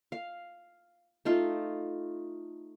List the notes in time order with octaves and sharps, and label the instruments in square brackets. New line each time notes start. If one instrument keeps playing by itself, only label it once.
[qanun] F5
A3 D#4 F4 F5